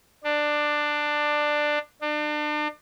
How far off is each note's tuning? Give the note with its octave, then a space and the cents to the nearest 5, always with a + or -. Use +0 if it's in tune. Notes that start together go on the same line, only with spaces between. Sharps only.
D4 +15
D4 +35